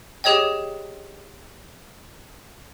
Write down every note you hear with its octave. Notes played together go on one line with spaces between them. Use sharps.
G4 G#4 C#5 D#5 G5